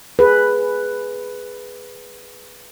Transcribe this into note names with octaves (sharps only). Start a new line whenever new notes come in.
G#4 B4